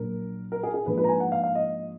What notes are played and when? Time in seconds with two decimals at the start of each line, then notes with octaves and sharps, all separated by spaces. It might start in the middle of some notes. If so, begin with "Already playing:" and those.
Already playing: A#1 A#2 F#3 D4 A#4
0.52 A#4
0.63 G#4
0.74 G#4
0.86 G#2 F3 A#3 D4 B4
0.98 B4
1.04 A#5
1.09 G#5
1.20 F#5
1.32 F5
1.43 F5
1.55 D#5